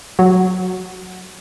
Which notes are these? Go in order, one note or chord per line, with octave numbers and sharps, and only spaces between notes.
F#3